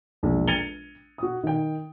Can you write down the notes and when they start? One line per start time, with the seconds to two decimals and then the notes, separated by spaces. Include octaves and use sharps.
0.23 E1 A#1
0.48 G#6 A6 C#7 D#7 F7 G7
1.18 F#4 D#6
1.43 D#3 G5